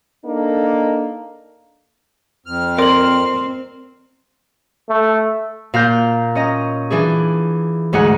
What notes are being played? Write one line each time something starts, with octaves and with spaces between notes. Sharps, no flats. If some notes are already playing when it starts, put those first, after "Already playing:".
A#3 D4 D#4 A4
F2 F6
C4 A#4 D5 C6 F#7
A3
A#2 F5 A#5 G6
C#4 D#5 A#5
E3 D4 G#4
D2 G#2 G#4 F#5 F#6